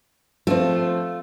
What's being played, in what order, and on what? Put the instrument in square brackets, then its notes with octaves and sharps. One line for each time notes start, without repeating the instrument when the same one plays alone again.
[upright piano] F3 C4 [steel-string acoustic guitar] A3 F4